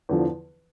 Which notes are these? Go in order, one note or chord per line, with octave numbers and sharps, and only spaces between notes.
E2 D3 F3